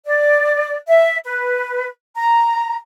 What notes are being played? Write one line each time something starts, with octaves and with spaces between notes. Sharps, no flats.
D5
E5
B4
A#5